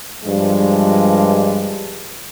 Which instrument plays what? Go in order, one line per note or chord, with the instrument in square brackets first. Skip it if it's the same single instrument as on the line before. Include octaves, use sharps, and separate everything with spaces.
[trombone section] G2 F3 G#3 D4 F4